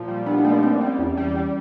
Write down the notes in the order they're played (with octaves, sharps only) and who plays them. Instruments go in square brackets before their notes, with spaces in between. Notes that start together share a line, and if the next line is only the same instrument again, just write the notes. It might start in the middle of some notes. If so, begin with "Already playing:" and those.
Already playing: [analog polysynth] A#2 F3
G3
[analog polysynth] B3 [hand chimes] D4
[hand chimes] D#4
[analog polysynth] G3 [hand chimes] A3
[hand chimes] A#3
[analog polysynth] G3 [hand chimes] C4
[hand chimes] C#4
[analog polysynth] G3
[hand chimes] C#4
[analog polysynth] E2
G3
G3